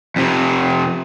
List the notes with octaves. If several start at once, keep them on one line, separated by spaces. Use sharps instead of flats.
F2 C3